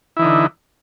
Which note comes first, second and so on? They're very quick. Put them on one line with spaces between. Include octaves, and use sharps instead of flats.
E4 E3 D#4 D3